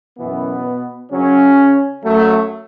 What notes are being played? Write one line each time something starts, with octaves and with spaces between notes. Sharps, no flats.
F#2 B2 E3 B3
F#2 C#3 F#3 C#4
F#2 F#3 A3